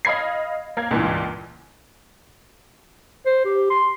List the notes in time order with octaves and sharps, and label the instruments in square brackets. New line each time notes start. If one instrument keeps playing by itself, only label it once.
[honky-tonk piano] D#5 F5 B5 G#6 C7
A#3 F5 G#6
C#2 G2 A#2 E3
[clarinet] C5
G4
C6